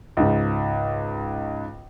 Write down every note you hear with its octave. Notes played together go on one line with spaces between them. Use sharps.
C#2 G#2